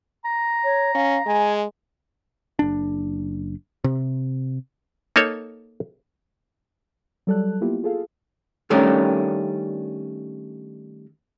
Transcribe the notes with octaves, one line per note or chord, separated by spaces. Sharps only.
A#5
C#5
C#4 F5
G#3 G#5
F#1 D4
C3
A#3 D#4 A4 C#5
F#3 G3 A4 D5 A5 F#6
A#3 B3 E4 F4 G4
F4 G#4 A4 F5
D#3 G3 A3 C#4 D4 A#4